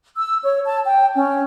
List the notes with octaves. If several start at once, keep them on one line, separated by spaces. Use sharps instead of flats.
E6
C#5
A5
G5
C#4